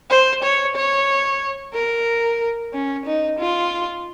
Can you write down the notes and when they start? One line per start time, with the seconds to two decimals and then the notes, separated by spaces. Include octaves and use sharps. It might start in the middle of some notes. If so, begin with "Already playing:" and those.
0.10 C5
0.43 C#5
0.75 C#5
1.74 A#4
2.73 C#4
3.06 D#4
3.39 F4